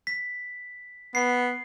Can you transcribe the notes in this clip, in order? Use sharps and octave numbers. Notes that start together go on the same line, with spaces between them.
B6
B3 C7